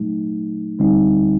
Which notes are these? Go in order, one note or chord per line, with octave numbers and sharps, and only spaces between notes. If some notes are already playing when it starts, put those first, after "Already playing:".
Already playing: A#2 F#3 A3 D#4
D2 D3 G3 C4 D#4